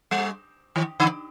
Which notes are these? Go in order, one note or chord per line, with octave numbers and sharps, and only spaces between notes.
G3
D#3
D3